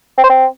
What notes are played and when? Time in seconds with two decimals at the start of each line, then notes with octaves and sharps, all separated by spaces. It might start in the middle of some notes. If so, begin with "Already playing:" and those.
0.18 C4
0.24 C5
0.29 C4